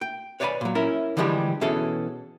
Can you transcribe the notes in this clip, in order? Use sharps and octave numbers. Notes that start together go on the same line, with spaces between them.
G5
B4 C#5 D5 F5 G#5 B5
A#2 F#3
C#4 E4 A#4
D3 E3 F3 G3 G#3 G4
B2 E3 C#4 G#4 A4